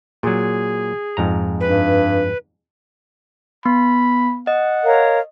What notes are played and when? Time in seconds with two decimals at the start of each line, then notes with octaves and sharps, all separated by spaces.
0.23 A#2 F#3 G#4
1.17 F2 G#2 A#5
1.60 G2 B4
3.65 B3 B5
4.47 D#5 F#5
4.84 A#4 C#5 F5